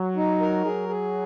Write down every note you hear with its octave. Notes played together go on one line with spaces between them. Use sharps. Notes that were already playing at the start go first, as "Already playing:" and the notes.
Already playing: F#3
D#4
A#4
F#3 G#4
G#4